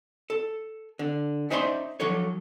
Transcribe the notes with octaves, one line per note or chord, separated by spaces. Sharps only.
A4
D3
C#4 D#4 C5 D5 E5 C6
F3 F#3 A4 C#5